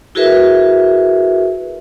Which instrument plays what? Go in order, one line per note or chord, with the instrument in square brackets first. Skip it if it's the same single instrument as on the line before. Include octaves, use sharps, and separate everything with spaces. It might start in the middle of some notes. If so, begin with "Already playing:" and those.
[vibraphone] E4 F#4 G#4 A#4 B4 E5